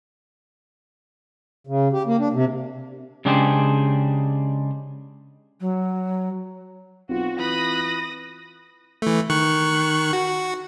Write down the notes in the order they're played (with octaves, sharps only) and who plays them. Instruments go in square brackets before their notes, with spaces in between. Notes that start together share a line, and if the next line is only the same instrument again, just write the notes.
[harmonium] C#3
G4
A#3
D4
C3
[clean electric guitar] C#3 G#3 D4 G4 G#4 C5
[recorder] F#3
[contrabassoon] B1 [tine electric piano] C4 F4 [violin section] F#4
[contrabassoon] E3 [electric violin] B5 F#6 [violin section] D#6 A#6
[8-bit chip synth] E3 A3
D#3 C#6 F#6
F#4